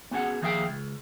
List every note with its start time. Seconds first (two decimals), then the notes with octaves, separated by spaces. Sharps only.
0.11 B3 C#4 F#4 G#4 F#5
0.42 D#2 F3 G#4 E5 F5 G5
0.68 C#2